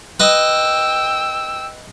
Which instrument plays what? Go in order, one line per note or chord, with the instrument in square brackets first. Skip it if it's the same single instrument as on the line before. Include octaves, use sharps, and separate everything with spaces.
[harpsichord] B4 D#5 [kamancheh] G5 E6